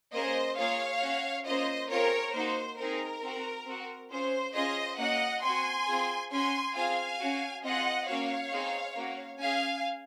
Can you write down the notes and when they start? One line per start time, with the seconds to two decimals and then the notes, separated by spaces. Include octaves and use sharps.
0.13 A#3 C#4 G#4 C5 D#5
0.57 A#3 F4 G#4 C#5 F5
1.01 C#4 F#4
1.45 A#3 C#4 F4 C5 D#5
1.90 C4 F4 G#4 A#4 C#5
2.34 A#3 D#4 F#4 C5
2.78 C4 D#4 G#4 A#4
3.22 C4 F#4
3.66 C4 F#4
4.10 C#4 F4 G#4 C5
4.54 C#4 F4 G#4 C5 D#5
4.98 A#3 C#4 F#4 D#5 F#5
5.42 C4 F#4 G#5 C6
5.87 C4 F4 G#4
6.31 C#4 F#4 G#5 C6
6.75 C4 F4 G#4 F5 G#5
7.20 C#4 F#4
7.63 C4 F4 G#4 D#5 F#5
8.08 A#3 C#4 F#4 C#5 F5
8.52 C4 D#4 G#4
8.96 A#3 C#4 F#4
9.40 C#4 G#4 F5 G#5